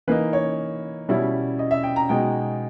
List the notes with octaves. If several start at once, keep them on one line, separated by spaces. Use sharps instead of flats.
E3 A#3 D#4 B4
C#5
B2 G3 C#4 E4
D#5
E5
G5
A#5
B2 G#3 D#4 G5